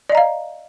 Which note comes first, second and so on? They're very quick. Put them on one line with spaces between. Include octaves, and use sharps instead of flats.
D5 D#5 A#5 F5